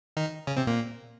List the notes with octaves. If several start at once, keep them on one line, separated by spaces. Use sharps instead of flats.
D#3 D#4
C#3 C#4
C3 C4
A#2 A#3